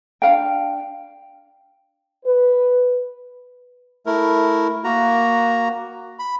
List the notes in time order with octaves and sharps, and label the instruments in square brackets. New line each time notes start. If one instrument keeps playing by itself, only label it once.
[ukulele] D4 F4 F5 G5
[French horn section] B4
[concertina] A3 E4 A#4
A#3 F#4 A#5
B5